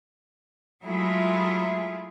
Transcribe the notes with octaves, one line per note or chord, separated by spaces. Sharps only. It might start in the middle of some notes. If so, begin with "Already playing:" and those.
F#3 G#3 A3 E4 F4 G#4